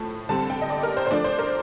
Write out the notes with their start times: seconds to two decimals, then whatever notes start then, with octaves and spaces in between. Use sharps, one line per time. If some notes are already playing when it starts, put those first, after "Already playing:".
Already playing: A2 F3 A3 A5
0.29 D3 G3 C4 A5
0.50 G5
0.62 D#5
0.70 D5
0.83 A#4
0.97 C5
1.07 C5
1.11 F3 A3 D4 D5
1.24 C5
1.39 A#4